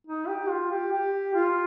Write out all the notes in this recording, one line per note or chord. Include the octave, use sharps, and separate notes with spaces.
D#4
G4
F4
G4
G4
F4